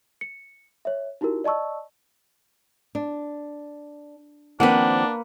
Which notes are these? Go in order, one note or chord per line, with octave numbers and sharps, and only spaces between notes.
C#7
C#5 E5
D#4 E4 F#4 G4 A#4
D5 D#5 A5 C#6 E6
D4
D#3 F3 A#3 C4 D4 B4 F#5